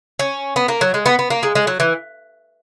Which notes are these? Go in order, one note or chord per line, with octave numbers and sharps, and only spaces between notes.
C#4
B3
A#3
F#3
G#3
B3
B3
A#3
G#3
G#3
F#3
E3